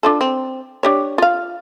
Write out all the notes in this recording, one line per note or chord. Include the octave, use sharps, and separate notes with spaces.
D4 F4 A4
C4
D4 G4 C#5
F4 F5